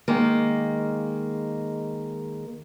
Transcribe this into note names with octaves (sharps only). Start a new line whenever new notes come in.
D#3 G#3 A#3